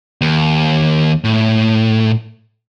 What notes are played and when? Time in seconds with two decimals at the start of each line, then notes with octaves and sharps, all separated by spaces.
0.21 D#2
1.24 A2